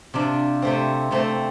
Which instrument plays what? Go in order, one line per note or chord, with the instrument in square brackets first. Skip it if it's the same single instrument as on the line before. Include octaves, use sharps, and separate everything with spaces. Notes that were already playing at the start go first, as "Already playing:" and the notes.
[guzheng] C3 F3 D4
C3 A3 C4
C3 A3 C4